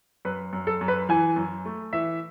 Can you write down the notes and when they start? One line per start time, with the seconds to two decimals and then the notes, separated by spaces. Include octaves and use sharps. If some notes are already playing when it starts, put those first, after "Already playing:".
0.25 F#2 B4
0.53 F#2
0.67 A4
0.81 F#2
0.88 B4
1.09 E3 G#5
1.36 F#2
1.66 A3
1.93 E3 E5